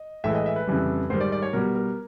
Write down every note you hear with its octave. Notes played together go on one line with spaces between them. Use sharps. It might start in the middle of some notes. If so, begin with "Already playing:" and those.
Already playing: D#5
A2 E3 G#3 E5
D#5
E5
B4
F2 C#3 E3 G3
G#2 D#3 G3 C5
D5
D5
C#5
B2 G3 A#4
A#4